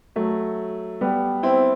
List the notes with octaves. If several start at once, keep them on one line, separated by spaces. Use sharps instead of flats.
F#3 A3
G3 B3
C4 E4